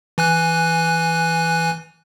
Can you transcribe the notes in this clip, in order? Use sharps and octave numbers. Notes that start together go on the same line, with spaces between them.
E3 G#5 F#6